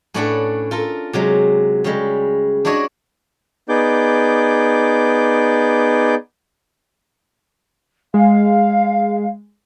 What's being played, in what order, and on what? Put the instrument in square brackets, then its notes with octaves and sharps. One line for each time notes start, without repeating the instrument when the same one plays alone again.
[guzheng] A2 A3 C#4 D4 B4 F#5
F4 A4 A#4
C3 F#3 G#3
C#3 G3 G#3
D4 E4 F#4 C#5 D#5
[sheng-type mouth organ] B3 D#4 G#4 D5 D6 G6
[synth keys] G#3 [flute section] F5